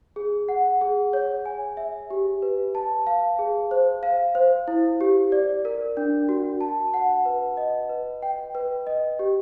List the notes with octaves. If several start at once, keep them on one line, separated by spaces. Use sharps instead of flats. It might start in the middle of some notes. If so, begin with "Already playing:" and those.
G#4
F#5
G#4
C#5
G#5
E5
G4
B4
A5
F5
G#4
C5
F5
C5
E4
G4
D5
A#4
D4
F#4
A5
F#5
B4
D#5
B4
G5
B4
D#5
G4